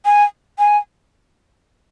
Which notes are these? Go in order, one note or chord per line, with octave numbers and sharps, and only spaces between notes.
G#5
G#5